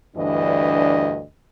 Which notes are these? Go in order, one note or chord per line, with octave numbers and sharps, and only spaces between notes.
D2 G2 E3 D4 D#5